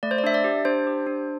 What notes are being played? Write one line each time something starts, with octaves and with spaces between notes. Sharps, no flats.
A3 D5
C5
D5
D4 E5
D5
G4
D4 C5
G4
D4